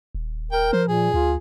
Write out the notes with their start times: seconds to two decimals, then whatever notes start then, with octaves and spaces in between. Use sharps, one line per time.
0.15 D#1
0.52 A#4 G5
0.73 F3 C5
0.89 A#2 G#4
1.14 D2 F4